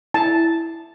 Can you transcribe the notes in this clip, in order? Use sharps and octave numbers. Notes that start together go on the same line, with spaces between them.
E4 A5